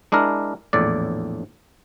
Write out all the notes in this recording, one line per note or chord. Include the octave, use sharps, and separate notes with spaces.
G#3 D4 E4 A#4
A#1 E2 A2 D5